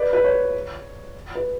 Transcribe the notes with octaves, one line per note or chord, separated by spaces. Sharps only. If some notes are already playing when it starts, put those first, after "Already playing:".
Already playing: B4 D5
B4
C#5
B4